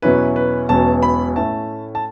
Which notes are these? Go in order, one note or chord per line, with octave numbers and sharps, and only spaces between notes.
E2 B2 F#3 C#4 E4 B4
B4
E1 E2 B2 F#3 C#4 A5
B5
A2 A3 C#4 E4 A5
A5